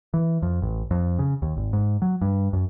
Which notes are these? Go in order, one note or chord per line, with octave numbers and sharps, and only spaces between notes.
E3
F2
A1
F2
C#3
D#2
G#1
G#2
F#3
G2
F#2